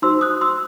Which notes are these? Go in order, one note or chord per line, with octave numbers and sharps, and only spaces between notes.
D#4 F#4 C5 C6 E6
D#6 F#6
C6 E6